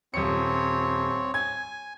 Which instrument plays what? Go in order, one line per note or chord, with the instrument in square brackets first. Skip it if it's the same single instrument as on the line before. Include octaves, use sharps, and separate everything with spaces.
[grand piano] D#1 C#7 [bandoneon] C4 C#5
[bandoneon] G#5 [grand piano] G#6